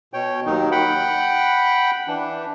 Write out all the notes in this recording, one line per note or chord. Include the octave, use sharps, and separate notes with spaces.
B2 C#5 G5
D#2 D#3 F#3 D#4
F#5 G5 B5
E3 D4